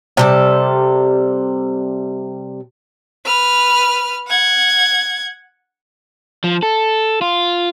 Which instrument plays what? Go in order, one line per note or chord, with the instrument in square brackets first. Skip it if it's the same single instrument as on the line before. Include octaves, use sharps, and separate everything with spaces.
[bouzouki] C3 G3 A4
[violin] B4 F6
F#5 G#6
[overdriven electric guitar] F3
A4
F4